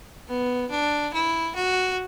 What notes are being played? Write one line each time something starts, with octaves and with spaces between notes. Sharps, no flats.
B3
D4
E4
F#4